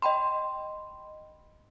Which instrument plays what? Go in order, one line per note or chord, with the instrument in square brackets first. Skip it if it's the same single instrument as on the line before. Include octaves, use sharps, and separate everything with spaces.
[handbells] D#5 G5 B5 C6